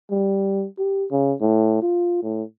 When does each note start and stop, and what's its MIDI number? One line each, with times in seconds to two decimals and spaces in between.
0.11 0.66 55
0.78 1.05 67
1.11 1.34 49
1.41 1.82 45
1.82 2.19 65
2.23 2.43 45